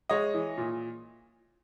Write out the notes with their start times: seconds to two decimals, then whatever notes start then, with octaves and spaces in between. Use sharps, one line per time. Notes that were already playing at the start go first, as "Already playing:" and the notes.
0.09 G#3 C#5 D#5
0.34 E3
0.58 A#2